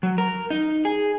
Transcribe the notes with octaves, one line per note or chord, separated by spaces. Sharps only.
F#3
A#4
D#4
G#4